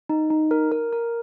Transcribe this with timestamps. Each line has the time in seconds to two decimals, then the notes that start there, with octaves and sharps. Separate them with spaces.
0.09 D#4
0.30 D#4
0.51 A#4
0.72 A#4
0.93 A#4